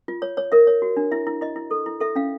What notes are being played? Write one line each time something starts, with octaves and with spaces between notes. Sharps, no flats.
F4
C#5
C#5
A#4 E5
C#5
F#4
D4
E4 E5
E4
E4 D#5
E4
A4
E4
A4 E5
C#4 F5